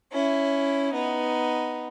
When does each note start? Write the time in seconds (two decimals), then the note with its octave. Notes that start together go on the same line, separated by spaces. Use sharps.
0.12 C#4 E4
0.94 B3 D#4